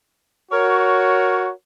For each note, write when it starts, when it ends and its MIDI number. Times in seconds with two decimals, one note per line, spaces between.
0.51 1.52 66
0.51 1.50 70
0.51 1.50 73